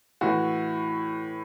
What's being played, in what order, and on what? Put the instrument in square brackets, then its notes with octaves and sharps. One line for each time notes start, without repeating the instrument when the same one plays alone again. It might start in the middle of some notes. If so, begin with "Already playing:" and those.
[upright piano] A2 E3 F#4